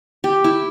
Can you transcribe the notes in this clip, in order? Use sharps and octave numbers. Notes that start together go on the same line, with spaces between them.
G4
E4